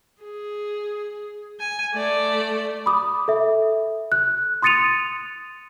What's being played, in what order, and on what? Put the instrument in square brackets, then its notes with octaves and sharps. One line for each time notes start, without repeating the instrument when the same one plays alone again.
[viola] G#4
G#5
A3 D5
[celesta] B5 D6 D#6
A4 E5
F#6
C6 D#6 A6 C#7 D#7 F7